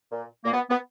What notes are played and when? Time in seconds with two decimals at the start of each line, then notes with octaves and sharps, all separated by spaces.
0.11 A#2
0.44 A#2 A#3
0.53 B3
0.70 B3